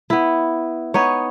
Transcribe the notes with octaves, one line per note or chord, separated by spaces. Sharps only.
B3 E4
B3 D#4 C#5